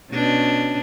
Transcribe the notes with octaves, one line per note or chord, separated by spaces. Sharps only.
B2 C#4 D4